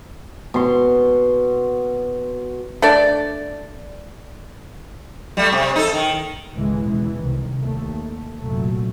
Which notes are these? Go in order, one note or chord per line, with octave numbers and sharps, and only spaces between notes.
B2 C6
A3 D4 D5
G3 A3
C3
D#4 A4
D#3
C#2 A2 C#3 E3 G#3
E2 B2 E3
C2 D#3
D#2 A3
C2 F#2 A#2 F#3 A3